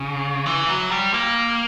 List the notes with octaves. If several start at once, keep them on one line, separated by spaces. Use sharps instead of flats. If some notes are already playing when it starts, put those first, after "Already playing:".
Already playing: C#3
E3
F#3
G3
A#3